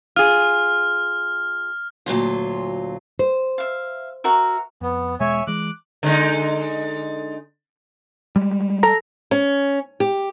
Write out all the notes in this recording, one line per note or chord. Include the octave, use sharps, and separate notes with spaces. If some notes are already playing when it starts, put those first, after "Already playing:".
F4 G#4 F6
D2 A#2 F#3 F4
C5
E5 F5
F#4 A#4 E5
F2 B3
E1 B2 G#3 C#5 E5 G#5
E3 G#3 D6 F#6
D3 G#3 D#4
G3 G#3
A4 A#5
C#4
G4